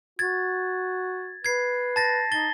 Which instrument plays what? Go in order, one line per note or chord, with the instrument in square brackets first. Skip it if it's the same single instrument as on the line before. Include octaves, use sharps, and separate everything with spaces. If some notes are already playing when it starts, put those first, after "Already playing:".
[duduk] F#4 [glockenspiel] G#6 A6
[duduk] B4 [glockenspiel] G#6 C7
[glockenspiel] A5 A6 A#6
[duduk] D#4 [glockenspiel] A6 G7